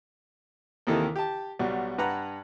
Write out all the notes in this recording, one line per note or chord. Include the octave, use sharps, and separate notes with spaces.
D#2 C3 D#3 E3 E4 A4
G4 A5
B1 G3 F#4
G2 B4 F#5 A#5 F#6